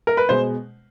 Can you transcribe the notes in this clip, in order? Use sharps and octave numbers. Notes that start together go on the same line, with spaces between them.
A#4
B4
B2 G#3 C5